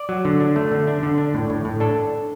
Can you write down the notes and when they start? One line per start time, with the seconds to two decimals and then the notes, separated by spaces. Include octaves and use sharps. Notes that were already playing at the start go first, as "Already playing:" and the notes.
Already playing: D5
0.09 F#3
0.25 D3
0.40 D4
0.56 A3
0.72 D3
0.87 D4
1.03 D3
1.18 D4
1.34 A2
1.50 A2
1.65 A2
1.80 D4 A4